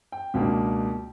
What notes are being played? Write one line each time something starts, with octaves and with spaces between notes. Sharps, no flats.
G5
C#2 B2 A#3 D4